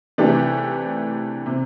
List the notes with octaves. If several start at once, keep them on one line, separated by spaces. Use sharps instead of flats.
C3 E3 A3 D4 G4
C3